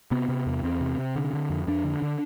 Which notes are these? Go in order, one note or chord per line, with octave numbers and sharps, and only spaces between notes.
C3 B3
C3
E2
E2 C4
C3
C3
D3
D3
F2
F2 D4
D3
D3